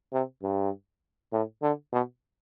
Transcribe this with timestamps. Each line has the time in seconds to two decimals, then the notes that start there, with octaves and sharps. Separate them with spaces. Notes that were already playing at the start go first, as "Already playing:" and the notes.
0.13 C3
0.42 G2
1.32 A2
1.62 D3
1.92 B2